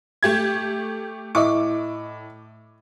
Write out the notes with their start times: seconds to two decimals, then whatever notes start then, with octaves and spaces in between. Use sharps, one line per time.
0.23 A3 G4 G#6
1.35 A2 D#5 E5 C#6 D6